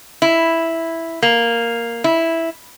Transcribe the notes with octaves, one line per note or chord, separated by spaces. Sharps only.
E4
A#3
E4